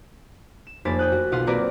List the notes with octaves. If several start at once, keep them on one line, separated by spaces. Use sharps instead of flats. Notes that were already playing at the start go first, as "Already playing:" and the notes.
E7
F1 A#3 C5 B5 A6
G5 D#6 F#6
F#4
B1 F4 D#5 F#5 B5 C6
F#3 A#3 C4 A#4 B4 D5